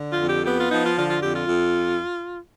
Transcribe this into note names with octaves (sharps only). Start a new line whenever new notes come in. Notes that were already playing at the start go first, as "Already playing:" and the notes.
Already playing: D3
F4
F2
G4
B3 G4
F4
F3 D#4
F4
D3 F4
F4
F2 G4
F4
F2